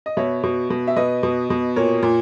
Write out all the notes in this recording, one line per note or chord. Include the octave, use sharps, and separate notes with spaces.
D#5
B2 C#5 E5
B2
B2
E5
B2 B4 D#5
B2
B2
A#2 A#4 C#5
A#2